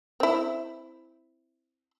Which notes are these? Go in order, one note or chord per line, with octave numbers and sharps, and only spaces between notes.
C4 E4